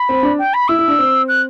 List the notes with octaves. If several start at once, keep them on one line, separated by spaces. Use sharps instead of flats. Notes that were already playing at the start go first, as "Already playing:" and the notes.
Already playing: B5
C4
D4
G5
B5
E4 E6
E4
D4
C4
F#6